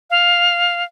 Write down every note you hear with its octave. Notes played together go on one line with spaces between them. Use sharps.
F5